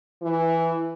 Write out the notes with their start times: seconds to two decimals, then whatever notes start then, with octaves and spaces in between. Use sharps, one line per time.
0.22 E3